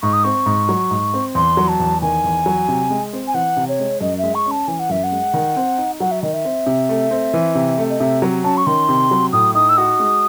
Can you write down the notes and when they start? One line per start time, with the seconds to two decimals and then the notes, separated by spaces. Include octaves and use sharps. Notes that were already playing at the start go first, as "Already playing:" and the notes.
0.02 G#2 C#6
0.13 D#6
0.24 C4 C#6
0.46 G#2
0.69 F#3
0.91 G#2
1.14 C4
1.35 E2 C6
1.57 F#3
1.68 A5
1.80 E2
2.02 D#3 G#5
2.24 E2
2.46 F#3
2.68 C3
2.90 G#3
3.13 C4
3.27 G#5
3.34 E3 F#5
3.57 C3
3.69 C#5
3.79 G#3
4.01 F#2 D#5
4.18 E5
4.24 G#3
4.35 C#6
4.46 C#4
4.51 A5
4.68 E3 G#5
4.80 F#5
4.89 F#2 E5
5.04 F#5
5.12 G#3
5.34 D#3
5.56 C4
5.78 D#4
6.00 F#3 F#5
6.11 E5
6.22 D#3 D#5
6.33 E5
6.45 C4
6.66 C3
6.89 A3
7.11 C4
7.34 E3
7.55 C3
7.78 A3
7.90 D#5
8.00 C3 E5
8.22 F#3
8.44 C#4 A5
8.57 C#6
8.66 D#3 C6
8.89 C3
9.11 F#3
9.33 A2 D#6
9.55 D#4 D#6
9.69 E6
9.77 F#4 D#6
10.00 G#3